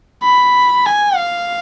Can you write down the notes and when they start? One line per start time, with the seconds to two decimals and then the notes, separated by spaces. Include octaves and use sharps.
0.23 B5
0.86 G#5
1.16 F5